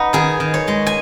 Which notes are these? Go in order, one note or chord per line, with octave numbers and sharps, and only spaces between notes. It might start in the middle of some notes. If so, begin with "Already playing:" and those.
Already playing: D#4 B4 F#5
D#3 G#4
D#3
C#5
G#3
G#5